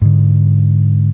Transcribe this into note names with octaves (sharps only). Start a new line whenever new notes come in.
G#2 D3